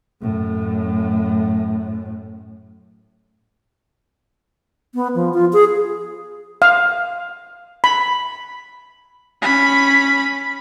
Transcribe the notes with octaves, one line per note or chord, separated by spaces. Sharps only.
F#2 A2
B3
F3
F4
G#4
F5
B5
C#4 B5